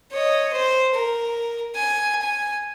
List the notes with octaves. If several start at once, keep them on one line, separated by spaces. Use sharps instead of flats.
C#5 D#5
C5
A#4
G#5
G#5